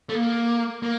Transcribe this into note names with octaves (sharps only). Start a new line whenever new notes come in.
A3
A#3
A#3